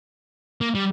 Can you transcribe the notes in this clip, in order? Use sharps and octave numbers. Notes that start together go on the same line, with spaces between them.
A#3
G3